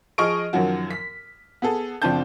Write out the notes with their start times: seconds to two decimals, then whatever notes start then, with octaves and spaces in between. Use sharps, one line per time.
0.18 F3 G#4 D#5 C#6 F6 D7
0.53 F#2 D#3 F3 F#3 F#4
0.91 B6
1.62 B3 G#4 A4
2.02 F#1 F3 C4 D4 A5 G6